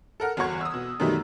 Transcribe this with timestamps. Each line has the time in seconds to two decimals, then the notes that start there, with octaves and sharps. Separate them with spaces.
0.20 A4 A#4 F#5 F6
0.37 G1 E2 F#4 F#5 C#6 G#6
0.61 D#6 E6
0.74 B2
1.00 F#2 B2 D#3 G3 A3 D#4